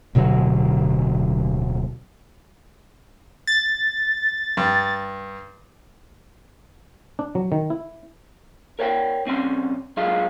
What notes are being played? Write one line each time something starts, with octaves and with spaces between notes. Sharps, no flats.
D1 B2 D3 F#3
A6
G2
D4
F#3
D#3
E4
A#4 C#5 D5 F#5 G5
B1 C4 C#4 D5 C6
F#3 G#3 D4 F4 F5